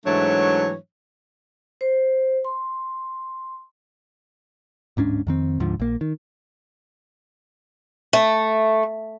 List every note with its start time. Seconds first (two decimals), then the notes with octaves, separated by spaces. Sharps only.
0.06 G#2 E3 F#3 A3 D4 C#5
1.81 C5
2.45 C6
4.97 D1 G#2 C#4 D4
5.27 F2 D#3 C4
5.60 D2 G#2 D3 F3
5.80 A#1 A#3
6.01 D#3
8.13 A3